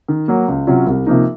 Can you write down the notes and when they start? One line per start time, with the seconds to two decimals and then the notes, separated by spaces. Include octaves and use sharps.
0.08 D#3
0.28 F#3 A#3
0.48 C#2
0.67 C3 F#3 C#4 F4
0.87 C2
1.07 C3 F3 A#3 D#4